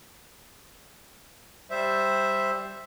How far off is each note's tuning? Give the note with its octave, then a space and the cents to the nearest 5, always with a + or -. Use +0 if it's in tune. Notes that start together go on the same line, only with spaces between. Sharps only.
G3 +0 C5 +0 E5 +0